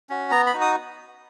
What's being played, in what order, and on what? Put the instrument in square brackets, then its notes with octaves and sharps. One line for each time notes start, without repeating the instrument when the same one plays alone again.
[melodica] C#4 F#4
B3 A#5
B5
D#4 F#4
D#6